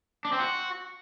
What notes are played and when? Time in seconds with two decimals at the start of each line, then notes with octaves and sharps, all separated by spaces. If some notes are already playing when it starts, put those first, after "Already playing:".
0.25 D4
0.32 C4
0.40 F#4